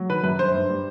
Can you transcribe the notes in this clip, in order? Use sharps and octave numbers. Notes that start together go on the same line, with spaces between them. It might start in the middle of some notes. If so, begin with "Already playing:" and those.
Already playing: F#3
D#3 B4
F#2 B4
G2 C5
G2
G3